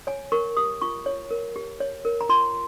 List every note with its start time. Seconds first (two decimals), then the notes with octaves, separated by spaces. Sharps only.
0.07 C#5 G#5
0.32 A#4 C#6
0.57 G4 D#6
0.82 F4 C#6
1.06 C#5
1.31 A#4
1.56 G4
1.80 C#5
2.05 A#4
2.21 A#5
2.29 F4 C6